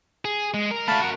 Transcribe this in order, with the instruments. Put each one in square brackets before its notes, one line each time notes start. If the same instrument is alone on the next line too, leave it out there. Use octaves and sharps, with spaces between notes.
[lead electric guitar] G#4
G#3
A#4
[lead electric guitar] A3 F#4 [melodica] F5 A5 B5
[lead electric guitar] F#4 A#4 [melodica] F#5